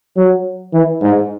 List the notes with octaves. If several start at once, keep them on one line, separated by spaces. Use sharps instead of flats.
F#3
E3
G#2